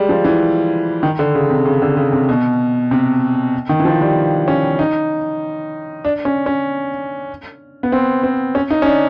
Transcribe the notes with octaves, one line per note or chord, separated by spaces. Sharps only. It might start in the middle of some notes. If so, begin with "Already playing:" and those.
Already playing: G3 G#3
F3
E3
D#3
D3
C#3
C3
C#3
D3
C#3
C3
B2
C3
D#3
E3
F3
G3
C#4
D#4
D4
C#4
C#4
B3
C4
C4
C#4
D#4
C#4
D4